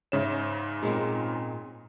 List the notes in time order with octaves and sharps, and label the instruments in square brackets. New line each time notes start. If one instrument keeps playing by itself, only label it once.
[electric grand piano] G#2 C#3 E7 [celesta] C#5 E5
[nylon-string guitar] A#2 G#3 C4 [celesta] D#4 G#4